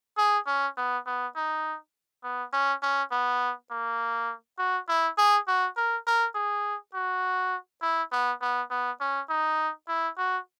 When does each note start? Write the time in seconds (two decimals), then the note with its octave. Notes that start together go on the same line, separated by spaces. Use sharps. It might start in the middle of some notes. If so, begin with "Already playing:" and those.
0.18 G#4
0.47 C#4
0.77 B3
1.06 B3
1.36 D#4
2.24 B3
2.53 C#4
2.82 C#4
3.12 B3
3.71 A#3
4.59 F#4
4.89 E4
5.18 G#4
5.48 F#4
5.77 A#4
6.07 A#4
6.35 G#4
6.94 F#4
7.82 E4
8.12 B3
8.41 B3
8.71 B3
9.00 C#4
9.30 D#4
9.88 E4
10.18 F#4